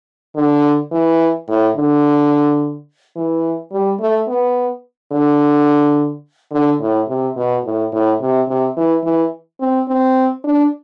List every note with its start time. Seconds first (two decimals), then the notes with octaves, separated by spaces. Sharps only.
0.36 D3
0.92 E3
1.48 A2
1.76 D3
3.16 E3
3.72 G3
4.00 A3
4.28 B3
5.12 D3
6.52 D3
6.80 A2
7.08 C3
7.37 B2
7.64 A2
7.93 A2
8.21 C3
8.48 C3
8.77 E3
9.04 E3
9.61 C4
9.88 C4
10.44 D4